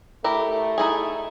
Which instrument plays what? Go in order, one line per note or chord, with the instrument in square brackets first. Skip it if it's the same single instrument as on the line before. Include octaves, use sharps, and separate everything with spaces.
[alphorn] A3 [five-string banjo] E4 G4 A#4
[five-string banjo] D#4 E4 G#4